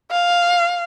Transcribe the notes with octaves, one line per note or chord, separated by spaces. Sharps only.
F5